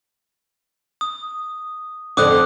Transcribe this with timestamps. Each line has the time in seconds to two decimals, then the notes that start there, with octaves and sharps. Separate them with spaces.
1.01 D#6
2.17 F2 D3 D6 D#6 F#6